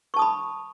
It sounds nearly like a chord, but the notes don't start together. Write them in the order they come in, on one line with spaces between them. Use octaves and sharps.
C#6 A5 D#6 B5